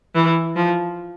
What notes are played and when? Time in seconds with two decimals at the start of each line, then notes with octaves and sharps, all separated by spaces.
0.15 E3
0.56 F3